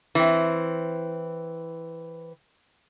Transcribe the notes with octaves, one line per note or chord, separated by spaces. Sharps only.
E3 C4